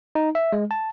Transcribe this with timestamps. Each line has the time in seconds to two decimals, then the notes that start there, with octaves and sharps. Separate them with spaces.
0.15 D#4
0.35 E5
0.53 G#3
0.71 A5